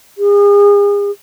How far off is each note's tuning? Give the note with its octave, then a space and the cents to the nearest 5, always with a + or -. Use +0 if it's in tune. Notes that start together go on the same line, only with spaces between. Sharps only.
G#4 -40